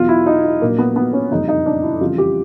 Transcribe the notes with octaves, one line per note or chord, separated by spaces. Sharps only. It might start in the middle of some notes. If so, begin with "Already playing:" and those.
Already playing: E2 B2 F#3 F4
E4
D#4
E4
A#1 A#2 F#3 A#3
B3
B3
C#4
F#1 F2 D3 G3 D#4
D#4
D4
E4
F2 C#3 E3 G3 F4
G4